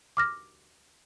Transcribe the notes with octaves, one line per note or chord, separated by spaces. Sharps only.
D6 F6 A#6